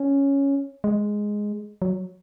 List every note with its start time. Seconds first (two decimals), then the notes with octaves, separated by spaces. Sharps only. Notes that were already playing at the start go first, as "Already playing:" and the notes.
Already playing: C#4
0.84 G#3
1.82 F#3